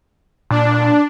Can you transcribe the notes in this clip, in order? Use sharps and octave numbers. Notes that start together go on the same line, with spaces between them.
A#2 D4